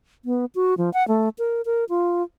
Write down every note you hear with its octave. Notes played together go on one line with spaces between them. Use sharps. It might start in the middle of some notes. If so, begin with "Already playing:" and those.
B3
F#4
F3
F#5
A3
A#4
A#4
F4